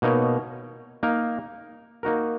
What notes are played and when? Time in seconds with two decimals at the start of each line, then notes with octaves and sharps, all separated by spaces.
0.02 B2 A#3 D#4 A#4 C#5
1.03 A#3 D#4 A#4
2.03 A#3 D#4 F#4 A#4